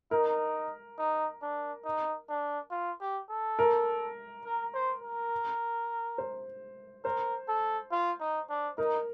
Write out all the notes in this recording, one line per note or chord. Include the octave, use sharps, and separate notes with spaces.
D#4 A#4
D#4
D4
D#4
D4
F4
G4
A4
A#4
A#4
C5
A#4
C5
A#4 C5
A4
F4
D#4
D4
D#4 A#4